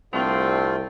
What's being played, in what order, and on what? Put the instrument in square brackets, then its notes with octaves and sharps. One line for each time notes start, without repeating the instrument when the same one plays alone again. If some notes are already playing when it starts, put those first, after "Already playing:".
[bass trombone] C2 [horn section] D3 C4 [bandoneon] G3 A3 F4